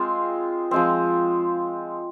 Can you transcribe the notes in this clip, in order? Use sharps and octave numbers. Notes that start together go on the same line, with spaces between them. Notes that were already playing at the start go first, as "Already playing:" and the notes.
Already playing: G#3 C4 F4
F3 G#3 C4